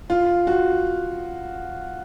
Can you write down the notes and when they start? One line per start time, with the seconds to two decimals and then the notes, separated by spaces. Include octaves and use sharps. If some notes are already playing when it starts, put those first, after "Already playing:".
0.10 F4
0.47 F#4